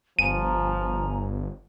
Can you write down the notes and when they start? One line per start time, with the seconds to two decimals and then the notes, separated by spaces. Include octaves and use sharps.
0.19 G1 F3 G#5 A#5 D#7